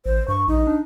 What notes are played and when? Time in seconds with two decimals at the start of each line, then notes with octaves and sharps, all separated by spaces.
0.06 A1 C5
0.28 G2 C#6
0.48 A#1 D#4
0.67 D4